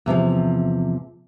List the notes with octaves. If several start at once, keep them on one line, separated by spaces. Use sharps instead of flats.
E2 C3 E3 F3